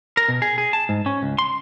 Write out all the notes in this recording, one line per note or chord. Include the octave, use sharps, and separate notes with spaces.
A#4
B2
G#4
G#4
A5
G#2
C#4
C#2
C6